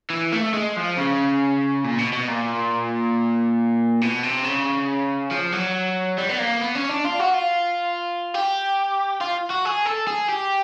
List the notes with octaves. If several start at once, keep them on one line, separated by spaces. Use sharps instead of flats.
E3
A3
G#3
F3
C#3
A#2
B2
B2
A#2
B2
C3
C#3
F3
F#3
G3
B3
A#3
B3
C#4
D4
F4
F#4
F4
G4
F4
F#4
G#4
A4
G#4
G4